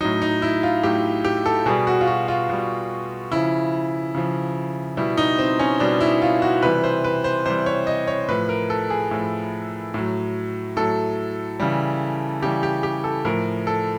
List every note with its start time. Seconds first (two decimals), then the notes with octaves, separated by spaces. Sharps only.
0.01 A2 F#3 D#4
0.22 D#4
0.42 E4
0.63 F4
0.83 A2 F#3 G4
1.25 G4
1.46 A4
1.66 B2 G3 G#4
1.87 F#4
2.01 F4
2.07 F#4
2.28 F4
2.49 B2 G3
3.32 C#3 F3 E4
4.14 C#3 F3
4.97 B2 G3 E4
5.17 D#4
5.39 C4
5.59 C#4
5.80 B2 G3 D4
6.00 E4
6.22 F4
6.42 F#4
6.63 C3 E3 G3 B4
6.84 C5
7.04 B4
7.24 C5
7.46 C3 E3 G3 C5
7.66 C#5
7.87 D#5
8.08 C#5
8.28 A2 F3 B4
8.49 A#4
8.70 A4
8.90 G#4
9.11 A2 F3
9.94 A2 F#3
10.76 A2 F#3 A4
11.60 C#3 E3 G3
12.42 C#3 E3 G3 G4
12.63 G4
12.83 G4
13.04 A4
13.25 A2 F3 A#4
13.67 A4